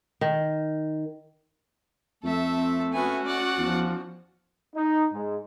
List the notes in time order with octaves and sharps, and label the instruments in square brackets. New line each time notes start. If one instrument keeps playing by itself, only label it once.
[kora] D#3
[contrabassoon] F2 [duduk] A3 [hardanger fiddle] A4 E5
[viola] C4
[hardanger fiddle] B3 G#5 [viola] C#4 F#4
[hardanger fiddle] D5 F#5
[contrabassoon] E2 [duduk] F3
[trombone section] D#4
G#2